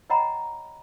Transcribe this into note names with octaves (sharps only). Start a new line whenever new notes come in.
C#5 D#5 F#5 G5 A#5 B5